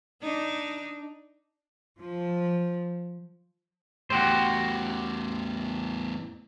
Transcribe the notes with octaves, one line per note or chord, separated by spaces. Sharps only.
D4 D#4
F3
E2 A2 F#4 G4 C5